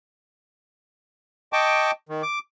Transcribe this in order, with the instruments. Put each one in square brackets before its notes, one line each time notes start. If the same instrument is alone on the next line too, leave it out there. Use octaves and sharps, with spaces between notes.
[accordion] D#5 G5 A5 C#6 D6
D#3
D6